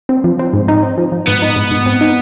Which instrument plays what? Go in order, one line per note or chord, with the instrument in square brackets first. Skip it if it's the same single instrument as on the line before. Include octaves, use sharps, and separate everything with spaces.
[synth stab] C4
F3
C4
G#2
D#4
C4
F3
F3
[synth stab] G#2 [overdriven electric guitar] B3
[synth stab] D#4
G#2
G#2
C4
D#4